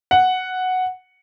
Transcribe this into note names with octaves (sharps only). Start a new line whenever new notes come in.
F#5